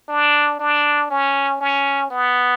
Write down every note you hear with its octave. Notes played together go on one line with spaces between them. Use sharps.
D4
D4
C#4
C#4
B3